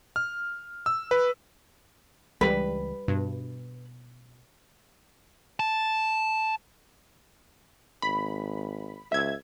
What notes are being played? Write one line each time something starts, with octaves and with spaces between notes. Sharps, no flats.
F6
E6
B4
C#2 E3 G3 G#3 B4
G2 B2
A5
G#1 B5
C#2 E5 G#6